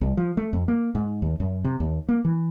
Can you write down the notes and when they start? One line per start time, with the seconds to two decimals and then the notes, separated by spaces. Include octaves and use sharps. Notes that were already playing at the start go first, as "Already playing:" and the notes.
0.01 C2
0.17 F3
0.37 A3
0.53 F2
0.68 A#3
0.95 G#2
1.22 D#2
1.40 F#2
1.64 C3
1.80 D#2
2.09 A#3
2.25 E3